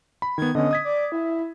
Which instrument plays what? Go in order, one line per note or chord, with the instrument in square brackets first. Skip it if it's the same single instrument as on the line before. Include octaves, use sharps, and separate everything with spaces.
[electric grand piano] B5
[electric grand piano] D#3 B3 [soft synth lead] G#6
[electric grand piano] D3 B3 C#4 [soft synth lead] D#5
[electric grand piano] D#6 G#6 B6
[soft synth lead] D5
E4